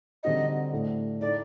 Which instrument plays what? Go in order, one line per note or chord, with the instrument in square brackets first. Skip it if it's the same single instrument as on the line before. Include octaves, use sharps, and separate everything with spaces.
[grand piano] D3 G3 C4 D#4 F#4 [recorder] D#5
[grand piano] A2 A3 D4
[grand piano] A2 A3 D#4 [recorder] D5